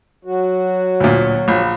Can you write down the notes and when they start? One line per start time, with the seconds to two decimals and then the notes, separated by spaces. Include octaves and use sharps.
0.25 F#3 F#4
1.00 D2 A#2
1.48 A#1